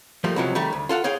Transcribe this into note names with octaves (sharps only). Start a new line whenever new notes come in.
F3 G3 A3 A#3
C#2 C3 F3 F#3
D#3 G3 A3
D2
F4 A4 F5 F#5
G#4 C#5 F5 G5